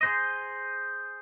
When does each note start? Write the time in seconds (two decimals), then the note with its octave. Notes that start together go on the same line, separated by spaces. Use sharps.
0.01 G#4 C5 D#5